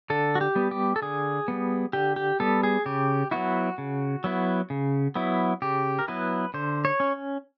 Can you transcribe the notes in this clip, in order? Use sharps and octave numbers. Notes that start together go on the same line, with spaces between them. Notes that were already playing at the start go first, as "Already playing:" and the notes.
D3 A4
F#4
G4
G3 B3
G4
A4
D3 G#4
G3 B3
D3 G4
G4
G3 B3 A4
G#4
C#3 G4
F#3 B3 E4 F#4
C#3
F#3 B3 E4
C#3
F#3 B3 E4
C#3 G4
A#4
F#3 B3 E4 B4
D3 C5
C#5
C#4